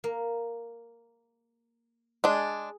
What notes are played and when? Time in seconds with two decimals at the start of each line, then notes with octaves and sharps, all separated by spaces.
0.04 A#3
2.24 G#3 D4 G#4